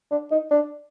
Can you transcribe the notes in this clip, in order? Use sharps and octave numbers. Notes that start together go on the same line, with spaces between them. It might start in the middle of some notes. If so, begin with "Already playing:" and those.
D4
D#4
D4